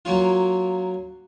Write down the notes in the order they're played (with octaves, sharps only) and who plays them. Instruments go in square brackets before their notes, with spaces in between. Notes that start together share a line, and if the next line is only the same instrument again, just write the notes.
[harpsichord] F#3 A#3 C#4 F4